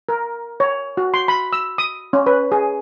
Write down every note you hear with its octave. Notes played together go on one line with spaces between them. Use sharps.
A#4
C#5
F#4
C6
B5
E6
D#6
C#4
B4
G#4